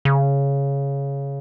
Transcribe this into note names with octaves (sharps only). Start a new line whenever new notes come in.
C#3